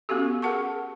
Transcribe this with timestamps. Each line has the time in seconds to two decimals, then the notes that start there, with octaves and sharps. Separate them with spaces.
0.09 B3 C#4 F#4 G4 A4
0.42 G#4 A#4 F#5 A5 C#6